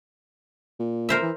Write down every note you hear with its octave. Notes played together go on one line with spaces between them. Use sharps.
A#2
A#4 C5 E5
E3